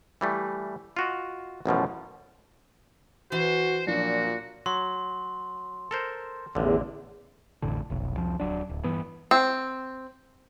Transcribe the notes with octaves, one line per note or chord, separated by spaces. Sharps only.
E3 G3 A3
F4 F#4 D#5
A1 F#2 B2 F3
E3 F#4 C5
A#2 F3 F#3 D4 F#4
F#3 C6
A4 A#4 C5
A1 E2 D3
A1 F2 A2 D3
F1 B1
C2 F2 F3
D#1 D#2 F#3 D4
D1
G2 E3 B3
C4